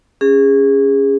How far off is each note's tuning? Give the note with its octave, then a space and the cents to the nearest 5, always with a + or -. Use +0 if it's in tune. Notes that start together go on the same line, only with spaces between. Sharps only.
C#4 +0 G#4 -25